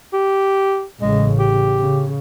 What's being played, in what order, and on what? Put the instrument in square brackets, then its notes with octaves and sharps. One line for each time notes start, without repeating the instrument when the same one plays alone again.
[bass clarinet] G4
[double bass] A1 C#3 [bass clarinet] G#3
[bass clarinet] G4
[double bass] C#3